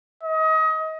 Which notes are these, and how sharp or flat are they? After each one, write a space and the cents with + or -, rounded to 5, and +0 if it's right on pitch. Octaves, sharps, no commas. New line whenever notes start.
D#5 +30